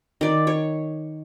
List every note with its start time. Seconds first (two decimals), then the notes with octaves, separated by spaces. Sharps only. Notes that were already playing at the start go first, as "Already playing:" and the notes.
0.21 D#3 D5
0.47 C#5